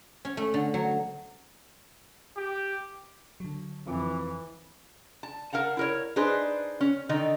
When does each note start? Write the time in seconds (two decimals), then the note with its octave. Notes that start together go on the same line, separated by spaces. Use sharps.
0.25 C#4
0.37 A3
0.54 D3
0.74 F#3
2.36 G4
3.40 D3 F#3
3.87 F2 E3 D6
5.23 A5
5.53 A#4 F5 F#5 A5
5.77 E4 A#4 C#5
6.16 D4 D#4 G#4 B4 C5
6.81 C#4
7.09 D3 D#3 D#4